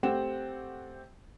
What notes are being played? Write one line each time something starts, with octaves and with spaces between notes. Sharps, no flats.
A3 C4 G4 F#5 G5 E7